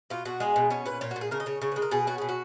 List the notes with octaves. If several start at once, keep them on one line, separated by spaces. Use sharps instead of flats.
B2 F4
B2 F#4
G#3 G#4
B2
C#4 C#5
A#2 B4
A#2 C#5
F#4
A#2
G#4
C#3 A#4
D#5
C#3 C#5
C#3 C#5
G#3 B4
A#4
B2 G#4
C#4 F#4
B2 G#4
F#4